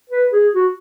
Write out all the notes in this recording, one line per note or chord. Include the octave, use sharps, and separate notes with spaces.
B4
G#4
F#4